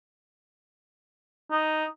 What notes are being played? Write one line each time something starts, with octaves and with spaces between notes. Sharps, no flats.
D#4